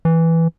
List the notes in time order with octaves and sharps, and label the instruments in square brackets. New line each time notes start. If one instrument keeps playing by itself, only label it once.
[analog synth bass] E3